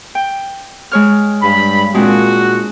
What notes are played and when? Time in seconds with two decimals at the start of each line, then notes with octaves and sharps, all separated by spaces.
0.15 G5
0.92 G#3 C#5 F6
1.42 G2 B5
1.95 A#2 G#3 C4 D4 F#4